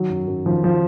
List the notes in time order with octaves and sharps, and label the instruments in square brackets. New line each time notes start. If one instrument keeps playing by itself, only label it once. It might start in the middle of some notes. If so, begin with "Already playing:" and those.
Already playing: [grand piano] D#3 F#3
F#2
F#2
D#3 F3
D#3 F3